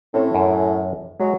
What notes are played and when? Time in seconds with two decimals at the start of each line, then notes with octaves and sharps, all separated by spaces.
0.14 A2 C4 C#4 A4
0.35 F#2 C#5
1.20 F#3 G#3 C#5